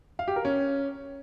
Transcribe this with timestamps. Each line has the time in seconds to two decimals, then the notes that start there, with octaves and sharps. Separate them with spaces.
0.19 F5
0.28 G4
0.36 A#4
0.45 C#4